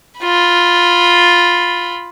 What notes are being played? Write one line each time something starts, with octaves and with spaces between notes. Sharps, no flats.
F4 B5